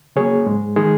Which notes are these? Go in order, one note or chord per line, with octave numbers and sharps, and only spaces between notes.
C#3 F#3 A#3 G#4 C#5
G#2 G#3
D#3 G#3 D#4 G#4